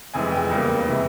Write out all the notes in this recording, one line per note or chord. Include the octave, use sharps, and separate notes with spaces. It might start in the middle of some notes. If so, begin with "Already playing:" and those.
F1 F2 E3 G#3 G#5
G5
E2 C#3 G3 A#3
C3 E3 G#3